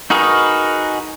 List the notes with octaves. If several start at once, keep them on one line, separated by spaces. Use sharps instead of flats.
D#4 F#4 G#4 A#4 B4